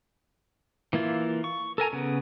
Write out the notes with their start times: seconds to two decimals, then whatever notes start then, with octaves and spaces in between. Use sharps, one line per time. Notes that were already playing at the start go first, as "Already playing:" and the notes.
0.93 E3 A#3 E4 F4
1.44 C#6
1.78 A4 A#4 G#5 A#5
1.93 C#3 B3